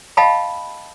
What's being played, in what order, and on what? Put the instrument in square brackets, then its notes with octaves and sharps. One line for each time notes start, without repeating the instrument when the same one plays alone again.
[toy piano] D#5 F5 G5 A5 B5